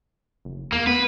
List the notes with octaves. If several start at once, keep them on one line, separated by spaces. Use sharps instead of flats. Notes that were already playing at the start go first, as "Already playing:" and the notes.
F#1
E2 A#3
B3 B4